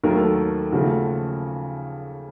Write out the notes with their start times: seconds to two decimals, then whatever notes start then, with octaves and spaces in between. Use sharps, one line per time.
0.03 D#2 D#3 F#3 A3 A#4
0.11 A4
0.19 A#4
0.72 D#2 C#3 F3 A3 F#4